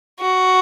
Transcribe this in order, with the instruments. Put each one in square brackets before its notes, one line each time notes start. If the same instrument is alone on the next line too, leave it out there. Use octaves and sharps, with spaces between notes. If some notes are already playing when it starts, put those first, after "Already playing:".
[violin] F#4